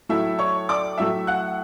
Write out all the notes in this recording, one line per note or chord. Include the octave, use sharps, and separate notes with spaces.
A2 F#3 A3 E4 E5
C#5 C#6
D5 D6
A2 F#3 A3 E5 E6
F#5 F#6